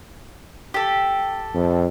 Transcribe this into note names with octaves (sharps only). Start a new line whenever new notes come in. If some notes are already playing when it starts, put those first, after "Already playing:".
G4 A4
F2